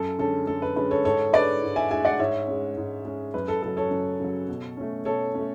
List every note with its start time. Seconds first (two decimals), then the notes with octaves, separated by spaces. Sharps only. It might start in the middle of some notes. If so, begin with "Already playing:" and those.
Already playing: F#2 A4
0.19 D3 G#3 C#4 A4
0.47 F#2 A4
0.62 B4
0.76 D3 G#3 C#4 B4
0.91 A4 C#5
1.05 G#2 A4 C#5
1.33 G#3 D4 B4 D5
1.63 G#2
1.76 E5 G#5
1.91 G#3 D4 E5 G#5
2.05 D5 F#5
2.19 G#2 C#5 E5
2.48 G#3 C#4
2.77 G#2
3.05 G#3 C#4
3.34 F#2 B4
3.48 A4
3.62 C#3 F#3 A4
3.77 A4 C#5
3.91 F#2
4.20 C#3 F#3
4.48 B2
4.77 A3 C#4
5.05 B2 A4 C#5
5.35 A3 C#4